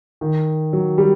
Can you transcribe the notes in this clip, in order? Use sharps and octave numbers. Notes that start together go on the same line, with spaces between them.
D#3
F#3
G3